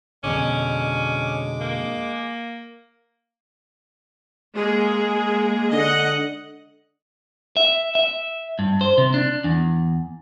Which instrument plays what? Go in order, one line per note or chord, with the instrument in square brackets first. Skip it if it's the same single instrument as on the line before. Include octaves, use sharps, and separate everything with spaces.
[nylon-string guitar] F2 B2 D3 [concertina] G#3 D6 [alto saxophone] C#4
[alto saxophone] A#3
[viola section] G#3 A#3 G#4
[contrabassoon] D3 [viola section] D#5 F#5
[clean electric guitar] E5
E5
G2
C5
C3
D4
E2